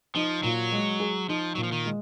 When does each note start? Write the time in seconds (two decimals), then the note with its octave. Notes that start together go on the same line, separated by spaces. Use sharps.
0.15 F3 D#4
0.43 A#2 F#3
0.72 G#3
1.00 G#4
1.29 F3 D#4
1.55 A#2 F#3
1.63 F3
1.72 D#3
1.86 G#3